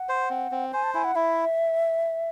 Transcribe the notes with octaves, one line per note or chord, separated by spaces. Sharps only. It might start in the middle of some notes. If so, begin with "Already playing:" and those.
Already playing: F#5
C5
C4
C4
C5 G#5
A5
E4 G#5
F#5
E4 E5